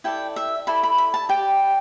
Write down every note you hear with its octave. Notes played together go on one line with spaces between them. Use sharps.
E4 A4 D5 G5
E5
E4 A4 D5 B5
B5
B5
A5
G4 D5 G5